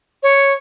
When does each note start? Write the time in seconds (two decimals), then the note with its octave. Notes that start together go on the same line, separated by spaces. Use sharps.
0.23 C#5